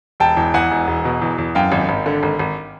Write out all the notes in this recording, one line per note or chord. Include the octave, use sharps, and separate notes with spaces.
E1 G5 A5
E2
E2 F#5 G#5
E1
E1
B2
E2
E2
F#2 F5 G5
G#1
G#1
D3
G#1
G#1